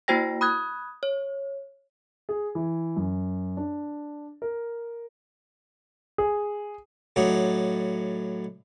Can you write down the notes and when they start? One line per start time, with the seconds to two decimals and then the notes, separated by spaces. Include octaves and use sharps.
0.08 A#3 E4 F#4 C5 G5 A#6
0.41 B5 D#6 F#6 G#6
1.03 C#5
2.29 G#4
2.55 E3
2.96 F#2
3.57 D4
4.42 A#4
6.18 G#4
7.16 A2 F#3 D4 D#4